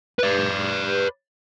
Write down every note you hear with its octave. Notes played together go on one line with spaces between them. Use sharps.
B4 D5